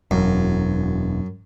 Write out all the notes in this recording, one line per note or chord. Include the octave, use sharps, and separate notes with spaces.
E1 F#2